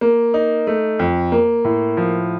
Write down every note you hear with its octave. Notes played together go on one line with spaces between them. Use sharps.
A#3
D#4
A3
F2
A#3
A2
F3